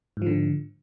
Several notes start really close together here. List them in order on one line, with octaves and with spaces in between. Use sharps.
G#2 F3 D3